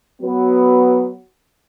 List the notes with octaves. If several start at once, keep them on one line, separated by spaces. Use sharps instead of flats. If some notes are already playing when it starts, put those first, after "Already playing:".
F#3 B3